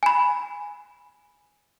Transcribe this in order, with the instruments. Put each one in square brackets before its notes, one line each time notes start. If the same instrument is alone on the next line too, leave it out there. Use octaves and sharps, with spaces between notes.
[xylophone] G#5 B5